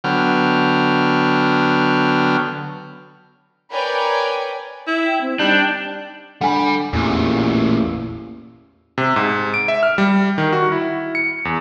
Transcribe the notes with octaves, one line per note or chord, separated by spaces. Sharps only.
D3 F#3 B3 G5 F6
A#4 B4 C#5 D5 G5 G#5
E4
G5
C4
G3 D4 D#4 G5
D3 G3 F#5 G#5 B5
A1 E2 A#2 A3
C3
G#2
D7
E5
F6
G3
D#3
F#4
E4
C#7
E2